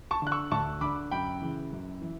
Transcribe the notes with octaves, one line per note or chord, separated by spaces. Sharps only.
A5 C#6
D3 F#6
C#6 E6
D2 A5 C#6
D3 B5 D6
F#2 G5 B5
C#3 E3
F#2
E3